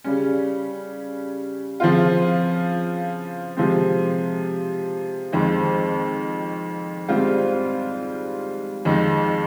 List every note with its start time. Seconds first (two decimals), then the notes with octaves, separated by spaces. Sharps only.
0.04 C#3 G3 C#4
1.80 C#3 F3 C4 F4
3.57 C3 F3 G#3 C4
5.32 F2 D#3 G#3 C4
7.08 G#2 G3 C4 F4
8.85 F2 D#3 G#3 D#4